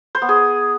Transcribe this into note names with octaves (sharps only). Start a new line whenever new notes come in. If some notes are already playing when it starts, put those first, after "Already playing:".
C5
B3
G#4